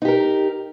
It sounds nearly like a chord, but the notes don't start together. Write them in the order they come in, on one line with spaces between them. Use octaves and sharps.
D#4 G4 A#4